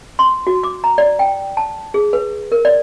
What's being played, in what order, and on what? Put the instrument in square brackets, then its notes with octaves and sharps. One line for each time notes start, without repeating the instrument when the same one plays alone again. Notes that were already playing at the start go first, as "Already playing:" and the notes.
[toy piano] C6
F#4
D6
A#5
D5
G5
A5
G#4
B4
A#4
D5